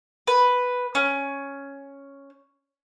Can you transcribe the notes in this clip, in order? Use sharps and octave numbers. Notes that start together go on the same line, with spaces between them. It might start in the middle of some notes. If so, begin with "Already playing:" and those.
B4
C#4